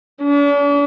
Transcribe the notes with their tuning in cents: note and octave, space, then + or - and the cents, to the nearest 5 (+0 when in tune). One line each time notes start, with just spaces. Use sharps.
D4 -45